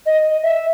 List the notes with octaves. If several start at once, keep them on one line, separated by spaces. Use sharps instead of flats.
D#5
E5